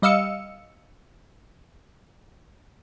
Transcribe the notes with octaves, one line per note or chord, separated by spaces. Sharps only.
G3 D#5 F5 E6 C#7